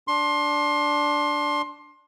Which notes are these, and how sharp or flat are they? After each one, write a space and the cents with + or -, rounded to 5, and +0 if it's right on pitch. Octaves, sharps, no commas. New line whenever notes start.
D4 -5 C6 +25